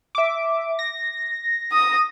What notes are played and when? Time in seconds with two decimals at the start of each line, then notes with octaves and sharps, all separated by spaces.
0.15 E5 D6
0.79 A#6
1.72 D#6